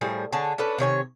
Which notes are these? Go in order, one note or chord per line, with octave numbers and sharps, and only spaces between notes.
A2 F3 G3 G#4
D3 G#4 C#5 A5
C#4 D4 A4 B4
C3 D#3 C#5 G#5